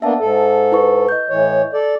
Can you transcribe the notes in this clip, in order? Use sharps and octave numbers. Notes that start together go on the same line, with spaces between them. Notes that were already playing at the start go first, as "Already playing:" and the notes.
A#3 B3 D4 E5 A5
G#2 A4
E4 B4 C#6
D#5 G6
A2 E3 C#5
A4 D5